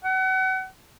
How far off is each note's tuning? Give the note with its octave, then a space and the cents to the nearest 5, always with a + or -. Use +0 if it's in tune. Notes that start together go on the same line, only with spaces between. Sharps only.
F#5 +35